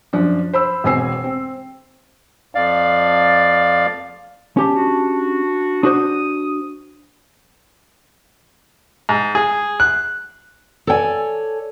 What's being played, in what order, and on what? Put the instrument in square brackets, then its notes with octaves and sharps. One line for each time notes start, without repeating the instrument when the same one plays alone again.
[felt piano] F#2 F3 C#4 D4
C5 B5 E6
E1 B3 C4 G#5 E6 C7
C4
[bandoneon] F2 D5 F5
[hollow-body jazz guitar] C#4 G4 A5
[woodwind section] D4 F#4
[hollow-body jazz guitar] D4 F#4 C5 [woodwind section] D#6
[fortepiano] G#2
G#4
F#6
[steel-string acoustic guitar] A4 C#5 D5 G5 G#5